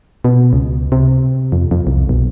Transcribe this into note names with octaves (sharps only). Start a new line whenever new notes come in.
B2
C#2
C3
F2
F2
C2
B1